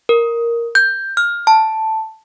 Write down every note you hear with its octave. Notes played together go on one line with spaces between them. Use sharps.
A#4
G6
F6
A5